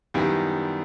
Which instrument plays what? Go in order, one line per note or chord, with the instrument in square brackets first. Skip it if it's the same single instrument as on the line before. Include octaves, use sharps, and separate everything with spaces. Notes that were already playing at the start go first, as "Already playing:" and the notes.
[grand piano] F#2 D#3 G3 B3 E4